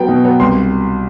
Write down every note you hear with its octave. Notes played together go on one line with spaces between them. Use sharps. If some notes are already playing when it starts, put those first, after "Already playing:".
Already playing: F#3 B3 G5
B2
F#3 B3
C2 C6